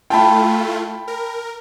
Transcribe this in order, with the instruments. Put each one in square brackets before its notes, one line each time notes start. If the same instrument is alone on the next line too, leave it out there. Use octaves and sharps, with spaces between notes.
[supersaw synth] A3 E4 F4 [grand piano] G5 A5 B5
[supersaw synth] A#4